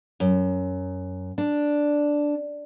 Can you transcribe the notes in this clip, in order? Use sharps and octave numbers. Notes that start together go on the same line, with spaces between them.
F#2
D4